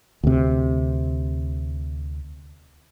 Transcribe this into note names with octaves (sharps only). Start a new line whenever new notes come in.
D2 C3